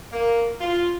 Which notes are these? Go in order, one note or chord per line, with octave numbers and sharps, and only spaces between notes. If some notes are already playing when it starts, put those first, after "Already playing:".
A#3
F4